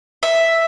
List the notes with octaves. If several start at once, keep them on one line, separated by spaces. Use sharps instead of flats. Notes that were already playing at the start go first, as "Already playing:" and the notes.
E5